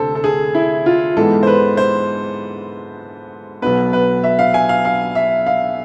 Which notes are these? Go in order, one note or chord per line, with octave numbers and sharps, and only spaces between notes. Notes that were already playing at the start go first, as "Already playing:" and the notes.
Already playing: D2 C3 A4 C5
A4
G#4
E4
F4
G#2 E3 G#3 B3 A4
C5
B4
C5
B1 B2 B3 B4
B4
E5
F5
G#5
F5
F5
E5
F5